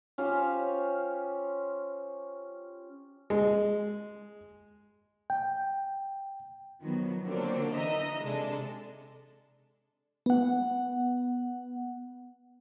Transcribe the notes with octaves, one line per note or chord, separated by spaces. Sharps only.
C#4 F4 G4 C5
G#3
G5
D#3 F3 F#3 B3
D3 F3 F#3 A#3 C4 D4
E3 D#4 D#5 E5 A#5
C3 G#3 D4 A4
B3 F#5